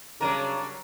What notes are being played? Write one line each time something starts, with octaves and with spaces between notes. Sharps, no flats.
C#3 F#3 G3 D4 A#4 A#5 D#7